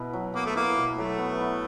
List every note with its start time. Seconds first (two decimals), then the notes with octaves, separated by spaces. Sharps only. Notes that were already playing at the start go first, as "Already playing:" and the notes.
Already playing: B2 B3 E4
0.13 F#3
0.34 A#3 B3
0.45 A3
0.56 A#3 E4
0.77 B2
0.98 F#3 A3
1.18 B3
1.41 E4